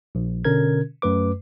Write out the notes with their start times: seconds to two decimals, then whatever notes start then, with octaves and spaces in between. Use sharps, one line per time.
0.15 A#1
0.45 B2 D3 C#4 A#4 G#6
1.02 F#2 A3 B4 D6